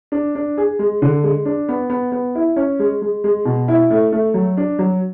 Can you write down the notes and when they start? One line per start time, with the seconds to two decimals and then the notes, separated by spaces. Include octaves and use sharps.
0.12 D4
0.35 D4
0.57 G#4
0.79 G#3
1.02 D3
1.23 G#3
1.45 D4
1.69 B3
1.90 B3
2.12 B3
2.35 E4
2.56 C#4
2.79 G#3
3.02 G#3
3.24 G#3
3.45 B2
3.68 E4
3.90 A3
4.12 A3
4.34 F#3
4.57 D4
4.79 F#3